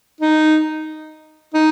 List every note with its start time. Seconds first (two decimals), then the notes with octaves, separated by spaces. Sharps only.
0.21 D#4
1.54 D#4